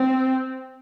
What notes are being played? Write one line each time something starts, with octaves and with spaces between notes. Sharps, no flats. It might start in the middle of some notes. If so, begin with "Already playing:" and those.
Already playing: C4